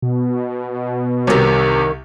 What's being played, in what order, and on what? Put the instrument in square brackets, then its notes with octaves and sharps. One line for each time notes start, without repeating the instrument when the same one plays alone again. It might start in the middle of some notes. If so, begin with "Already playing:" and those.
[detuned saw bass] B2
[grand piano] C2 C3 [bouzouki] D#3 C#5